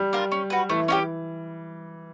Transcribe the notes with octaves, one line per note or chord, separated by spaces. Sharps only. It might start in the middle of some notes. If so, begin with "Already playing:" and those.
Already playing: G3
D4 F4 A#4
C#4
F#4 B4
E3 A3
C#4 E4 G4